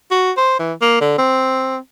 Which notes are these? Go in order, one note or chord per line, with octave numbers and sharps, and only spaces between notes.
F#4
C5
E3
A#3
D3
C4